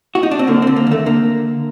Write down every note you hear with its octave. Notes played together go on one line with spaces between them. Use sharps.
F#4
D#4
D4
C4
D3 A#3
D3 C4
A#3
D#2 A3
D3 A#3